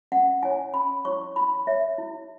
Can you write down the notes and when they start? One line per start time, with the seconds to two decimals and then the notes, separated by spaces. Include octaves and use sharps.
0.12 C#4 F#5
0.43 E4 C#5 G#5
0.74 C#4 B5
1.05 E4 C#5 C#6
1.36 E4 B5
1.67 C#5 E5
1.98 E4